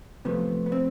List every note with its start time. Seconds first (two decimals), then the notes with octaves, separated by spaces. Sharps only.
0.25 C3 F3 A3 B3
0.66 B3
0.72 C4